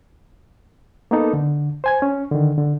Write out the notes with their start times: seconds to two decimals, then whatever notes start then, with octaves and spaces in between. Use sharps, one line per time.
1.11 A#3 B3 D#4 A4
1.33 D3
1.84 C5 G#5 G#6
2.02 C#4
2.31 D3 D#3
2.58 D3